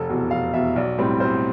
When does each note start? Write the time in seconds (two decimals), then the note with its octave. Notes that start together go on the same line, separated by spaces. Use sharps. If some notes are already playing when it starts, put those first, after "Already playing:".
Already playing: F1 A4
0.09 E2 B2
0.31 F1 F5
0.53 E2 B2 E5
0.76 B1 D5
0.98 A2 G3 C4
1.20 B1 C5